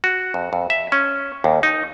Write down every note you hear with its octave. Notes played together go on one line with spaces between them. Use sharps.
F#4
F2
F2
E5
C#4
D#2
D#4